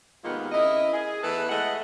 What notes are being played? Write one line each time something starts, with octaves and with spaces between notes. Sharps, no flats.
G#2 C3 D#3 A#3 B3 F4
C#3 E4 A#4 D#5
G#4
E2 E3 A3 A4 B4
G#3 A3 E4 A4 D#5 F#5